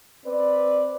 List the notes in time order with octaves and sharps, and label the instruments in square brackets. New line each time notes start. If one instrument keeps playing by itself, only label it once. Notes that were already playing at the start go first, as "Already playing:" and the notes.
[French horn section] C4 B4 D5